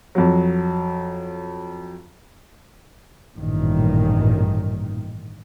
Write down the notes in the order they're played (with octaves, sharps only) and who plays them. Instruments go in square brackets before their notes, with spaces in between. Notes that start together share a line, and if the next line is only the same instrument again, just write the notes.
[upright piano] F2 F#3
[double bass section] A1 G2 A#2 D#3